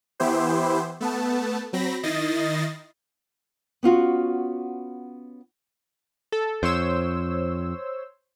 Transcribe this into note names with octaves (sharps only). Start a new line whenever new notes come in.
E3 B3 E4 G4 C5
A3 B3 A5
F#3 C4 B5 A#6
D#3 E4 D#5 A6 A#6 C7
B3 C#4 F4 F#4
A4
F2 C5 C#5 E6